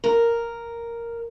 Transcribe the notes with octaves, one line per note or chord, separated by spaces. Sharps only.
A#4